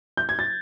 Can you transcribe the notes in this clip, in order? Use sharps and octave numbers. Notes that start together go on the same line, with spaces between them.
G6
G#6
A6